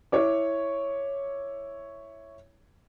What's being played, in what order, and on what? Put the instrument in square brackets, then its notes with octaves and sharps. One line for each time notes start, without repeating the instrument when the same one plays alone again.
[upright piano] E4 C#5 D6